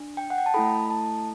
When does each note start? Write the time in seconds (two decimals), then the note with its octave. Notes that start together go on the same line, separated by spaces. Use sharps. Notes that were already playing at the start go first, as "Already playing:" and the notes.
Already playing: D4
0.17 G5
0.30 F#5
0.38 G5
0.46 A5
0.54 A3 E4 A4 B5
0.90 A5